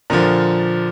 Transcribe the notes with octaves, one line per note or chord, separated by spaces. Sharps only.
A#2 D3 F3